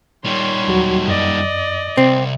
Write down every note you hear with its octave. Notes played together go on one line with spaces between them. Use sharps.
D#3 G3 C#5 C6
D#2 F#3 F#4
F#2 D5 D#5
C2 C4